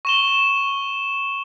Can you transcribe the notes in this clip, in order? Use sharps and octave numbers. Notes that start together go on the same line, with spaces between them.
C#6 E7 G7